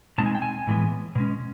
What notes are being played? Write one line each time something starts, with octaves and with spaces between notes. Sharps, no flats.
B2 G#3 C4 D#4 A5
G#5
G5
G#5
A2 E3 G#3 B3
B2 G#3 C#4